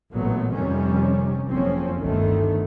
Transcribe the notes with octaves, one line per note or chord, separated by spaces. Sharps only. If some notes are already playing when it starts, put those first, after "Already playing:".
A1 A#2 F#3 A3 B3
F1 F2 C3 D#3 G3 C#4
F#1 F2 F3 C4 C#4
G1 D2 D3 D#3 A3